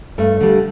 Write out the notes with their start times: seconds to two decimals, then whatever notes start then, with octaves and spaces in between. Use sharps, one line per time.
0.18 G2 A3
0.40 D3 G3